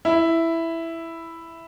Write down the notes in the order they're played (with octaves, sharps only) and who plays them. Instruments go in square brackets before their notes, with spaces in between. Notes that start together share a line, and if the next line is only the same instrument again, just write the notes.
[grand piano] E4